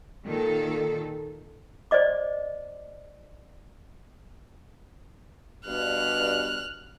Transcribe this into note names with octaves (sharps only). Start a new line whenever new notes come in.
A#2 D#3 A4
C5 D5 D#5 D6
G2 B2 F6 F#6